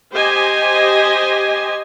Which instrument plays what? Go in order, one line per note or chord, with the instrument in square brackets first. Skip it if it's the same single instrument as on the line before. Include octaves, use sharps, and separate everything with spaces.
[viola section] G4 C5 D#5 G#5